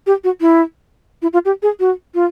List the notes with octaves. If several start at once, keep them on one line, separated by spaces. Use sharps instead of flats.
G4
F#4
E4
E4
F4
G4
G#4
F#4
F4